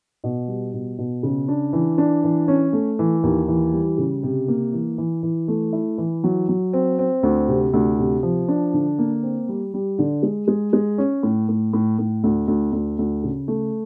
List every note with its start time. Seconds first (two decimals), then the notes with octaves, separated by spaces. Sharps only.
0.24 B2
0.48 G3
0.73 B2
0.98 B2
1.23 C#3
1.48 D4
1.73 E3
1.98 D4
2.24 E3
2.48 C#4
2.73 A3
2.99 E3
3.23 D#2
3.48 E3
3.73 G3
3.98 C#3
4.23 C3
4.48 A#3
4.73 E3
4.98 E3
5.23 E3
5.48 A3
5.73 E4
5.98 E3
6.24 F#3
6.49 F#3
6.73 C4
6.99 C4
7.23 D2
7.48 C3
7.73 D2
7.99 C3
8.23 F3
8.48 D4
8.73 D3
8.98 A#3
9.23 C4
9.49 G3
9.74 G3
9.99 D3
10.23 G#3
10.48 G#3
10.73 G#3
10.98 C#4
11.23 A2
11.49 A2
11.73 A2
11.99 A2
12.24 D2
12.48 D2
12.73 D2
12.99 D2
13.24 C#3
13.48 A3